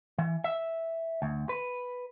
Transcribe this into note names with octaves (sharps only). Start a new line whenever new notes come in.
E3
E5
D2
B4